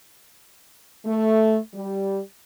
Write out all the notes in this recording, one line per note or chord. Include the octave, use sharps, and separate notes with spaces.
A3
G3